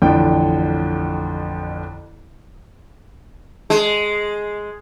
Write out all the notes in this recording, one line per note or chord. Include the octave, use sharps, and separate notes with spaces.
A1 F2 D3 G5
G#3